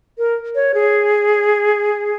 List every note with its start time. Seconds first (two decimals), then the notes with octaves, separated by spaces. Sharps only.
0.18 A#4
0.55 C#5
0.74 G#4